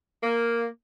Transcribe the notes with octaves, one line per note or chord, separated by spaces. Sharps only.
A#3